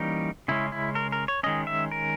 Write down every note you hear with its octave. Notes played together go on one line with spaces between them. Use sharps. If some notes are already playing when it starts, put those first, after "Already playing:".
Already playing: E3 G3 A#3 C#4 D#4
C#3 G#3 C#4 E4
E4
A#4
A#4
C#5
D#3 G#3 C#4 D#5
E5
A#4